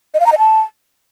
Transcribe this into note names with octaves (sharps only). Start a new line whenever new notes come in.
D#5
F5
A#5
D#5
A5